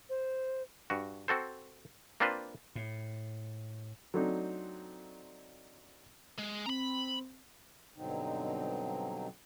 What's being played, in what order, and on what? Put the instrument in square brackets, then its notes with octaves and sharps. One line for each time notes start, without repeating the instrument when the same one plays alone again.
[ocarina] C5
[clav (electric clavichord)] G2 F#4
C4 F#4 A4 C5
A#3 C4 D4 F4 B4 C5
[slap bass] A2
[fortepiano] F#3 A3 C4 D4 D#4
[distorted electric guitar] G#3
[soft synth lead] C4 [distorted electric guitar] A#5 B5
[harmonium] G2 B2 D3 F#3 C4 D#4